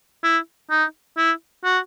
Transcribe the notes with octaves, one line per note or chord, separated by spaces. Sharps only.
E4
D#4
E4
F#4